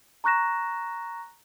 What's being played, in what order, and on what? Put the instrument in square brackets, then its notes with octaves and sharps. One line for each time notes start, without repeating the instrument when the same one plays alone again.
[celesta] A#5 C#6 F#6 A#6 E7